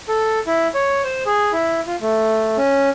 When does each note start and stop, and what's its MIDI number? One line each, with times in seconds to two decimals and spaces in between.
0.08 0.39 69
0.47 0.68 64
0.74 1.02 73
1.04 1.24 72
1.26 1.52 68
1.53 1.81 64
1.87 1.96 65
2.01 2.57 57
2.57 2.90 61